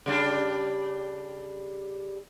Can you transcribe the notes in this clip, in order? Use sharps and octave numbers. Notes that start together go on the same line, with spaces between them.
C#3 G3 D4